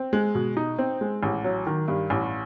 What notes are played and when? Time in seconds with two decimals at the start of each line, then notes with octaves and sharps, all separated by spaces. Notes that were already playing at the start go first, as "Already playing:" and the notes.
Already playing: C4
0.13 G#3
0.35 B2
0.57 D#4
0.79 C4
1.01 G#3
1.23 A1
1.44 F#3
1.67 D#3
1.88 G2
2.10 A1